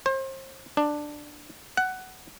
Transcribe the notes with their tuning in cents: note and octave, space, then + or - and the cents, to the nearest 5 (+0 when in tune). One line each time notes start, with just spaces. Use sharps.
C5 +35
D4 +10
F#5 +10